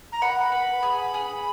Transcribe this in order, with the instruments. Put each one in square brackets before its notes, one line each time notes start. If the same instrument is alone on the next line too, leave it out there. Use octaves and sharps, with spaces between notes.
[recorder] A#5
[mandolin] F#5 [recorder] B5
[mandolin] B4
G#4
G#4